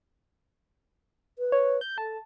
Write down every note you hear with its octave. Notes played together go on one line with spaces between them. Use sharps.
B4
C#5
G6
A4 A5